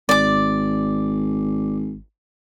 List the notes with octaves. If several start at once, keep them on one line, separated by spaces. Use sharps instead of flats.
G#1 D5 D6